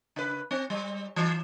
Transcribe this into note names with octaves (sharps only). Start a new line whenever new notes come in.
C#3 B4
C4
G3
E3